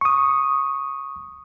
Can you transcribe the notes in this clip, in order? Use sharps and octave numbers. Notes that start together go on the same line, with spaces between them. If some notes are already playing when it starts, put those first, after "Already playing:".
C#6 D#6